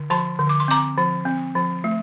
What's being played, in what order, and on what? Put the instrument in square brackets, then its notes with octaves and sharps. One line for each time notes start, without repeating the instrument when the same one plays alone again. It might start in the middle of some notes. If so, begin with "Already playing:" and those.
Already playing: [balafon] D3
F3 A5 C6
D3
D6
C6
C4 A#5 D6
F3
C4
F3
A3